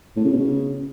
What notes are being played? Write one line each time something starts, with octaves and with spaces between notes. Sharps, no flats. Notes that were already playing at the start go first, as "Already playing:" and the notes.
A2
C#3
B2
C#3